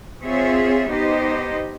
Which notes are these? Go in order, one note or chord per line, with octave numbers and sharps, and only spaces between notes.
C4 F4 G#4 C#5 E5
B3 D#4 G4 C5 D#5